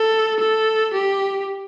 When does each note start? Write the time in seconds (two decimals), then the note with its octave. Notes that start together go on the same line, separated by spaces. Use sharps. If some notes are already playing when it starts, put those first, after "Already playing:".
Already playing: A4
0.40 A4
0.94 G4